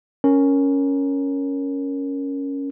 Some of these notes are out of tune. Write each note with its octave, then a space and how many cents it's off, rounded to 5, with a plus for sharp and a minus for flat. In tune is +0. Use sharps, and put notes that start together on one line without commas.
C#4 +0 A#4 +0